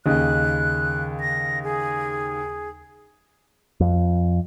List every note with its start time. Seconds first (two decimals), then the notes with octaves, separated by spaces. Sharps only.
0.06 D#2 C#3 D#5 F#6
1.20 A#6
1.63 G#4
3.80 F2